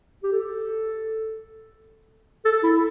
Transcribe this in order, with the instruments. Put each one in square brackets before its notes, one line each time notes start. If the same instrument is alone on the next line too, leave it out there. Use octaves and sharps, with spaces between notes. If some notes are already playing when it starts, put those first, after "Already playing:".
[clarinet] G4
A4
A4
E4